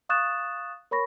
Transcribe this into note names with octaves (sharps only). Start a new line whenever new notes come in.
F5 C#6 D#6 F#6 A6 E7
A#4 C#5 B5 C#6 A#6